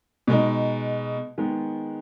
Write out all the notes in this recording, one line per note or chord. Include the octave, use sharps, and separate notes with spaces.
B2 G#3 D#4
D#3 G#3 B3